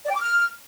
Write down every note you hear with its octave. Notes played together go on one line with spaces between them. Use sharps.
D5
G5
D6
F6